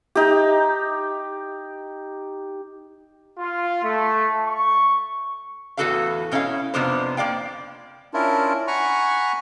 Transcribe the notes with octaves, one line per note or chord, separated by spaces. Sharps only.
D#4 G4
F4
A3
C#6
E2 A2 F#4 A4 B4 F5
B2 C#4 E4 A#4 F5
F2 C3 F3 B3 D4 C5
A#3 D5 F5 G5
C#4 D4 E4 F4 A#4
F#5 G#5 A#5 B5 C#6